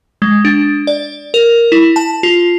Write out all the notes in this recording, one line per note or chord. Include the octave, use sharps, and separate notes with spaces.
G#3
D4
D5
A#4
E4
A5
F4